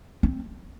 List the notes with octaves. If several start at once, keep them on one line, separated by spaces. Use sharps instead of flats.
C4